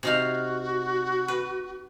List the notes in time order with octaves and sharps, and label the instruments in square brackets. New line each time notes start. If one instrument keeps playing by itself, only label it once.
[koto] C3 D#4 F5 [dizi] F#4
[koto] B4